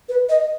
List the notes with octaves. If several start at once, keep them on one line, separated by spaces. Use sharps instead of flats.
B4
D#5